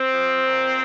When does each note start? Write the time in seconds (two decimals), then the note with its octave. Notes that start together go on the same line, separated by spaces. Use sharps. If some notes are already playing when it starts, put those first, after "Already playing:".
Already playing: C4
0.14 F3
0.44 A#2